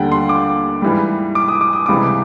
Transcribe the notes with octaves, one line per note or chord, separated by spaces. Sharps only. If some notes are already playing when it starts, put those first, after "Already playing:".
Already playing: D#2 D3 G3 F#5 G5
C6
D6
G#2 E3 G3
D6
D#6
D6
D#6
C#2 C3 E3 G3 D6